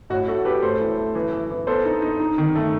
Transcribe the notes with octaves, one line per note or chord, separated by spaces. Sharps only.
A2 F#4
A3 F#4 A4
A3 G4 B4
A2 A4 C5
E3
A3
E3
E3
E3
B3 A4 C5
D#4
D#4
D#4
D#3
A3